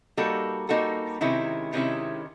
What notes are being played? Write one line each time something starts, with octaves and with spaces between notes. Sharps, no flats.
G3 A#3 D#4 F#4 A4
G3 A#3 D#4 F#4 A4
C3 D#3 G#3 C#4 E4
C3 D#3 G#3 C#4 E4